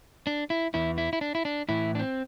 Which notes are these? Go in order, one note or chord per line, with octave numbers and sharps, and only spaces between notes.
D4
E4
E2 E3 E4
E4
E4
D4
E4
D4
A2 E3 E4
D4
C4